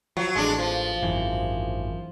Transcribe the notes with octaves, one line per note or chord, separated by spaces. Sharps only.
F3 F#3
A1 G#3 D4
F3
G#1 F#2 E3